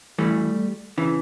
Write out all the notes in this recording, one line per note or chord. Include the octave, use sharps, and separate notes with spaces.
F#2 C#3 E3 G3 A3
C#3 E3